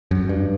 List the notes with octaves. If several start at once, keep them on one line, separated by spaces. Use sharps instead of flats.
F#2
G2